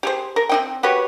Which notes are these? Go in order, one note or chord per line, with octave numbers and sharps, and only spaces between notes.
G4 G#4 C5
A#4
C4 D#4 G5
F#4 G4 B4 C#5